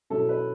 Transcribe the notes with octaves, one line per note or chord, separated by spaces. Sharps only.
B2 F#3 C#4 E4 A4
B4